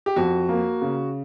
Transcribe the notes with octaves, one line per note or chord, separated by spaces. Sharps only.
G4
F2 F#4
A#3
C#3